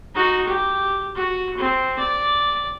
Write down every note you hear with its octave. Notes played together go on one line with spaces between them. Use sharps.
D#4 F#4
G4
F#4
C4
D5